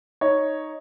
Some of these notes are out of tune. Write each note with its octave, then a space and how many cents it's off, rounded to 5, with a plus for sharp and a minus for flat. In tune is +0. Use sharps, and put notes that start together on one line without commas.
D#4 +0 C#5 +0